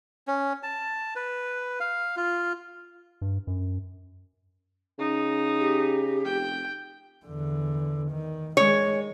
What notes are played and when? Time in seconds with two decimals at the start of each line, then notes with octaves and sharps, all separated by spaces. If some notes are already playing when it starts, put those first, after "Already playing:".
0.28 C#4
0.63 A5
1.16 B4
1.80 F5
2.17 F4
3.21 G2
3.47 F#2
4.99 C#3 D#4
5.60 G4
6.25 F1 G5
7.26 E2 D3
8.12 D#3
8.57 D#3 G#3 C#5